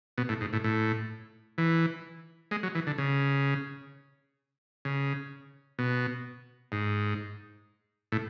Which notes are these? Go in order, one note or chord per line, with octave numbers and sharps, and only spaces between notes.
B2
A2
G#2
A2
A2
E3
G#3
F#3
E3
D3
C#3
C#3
B2
G#2
A2